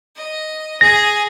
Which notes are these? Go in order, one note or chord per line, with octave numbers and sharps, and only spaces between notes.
D#5
G#4 A#6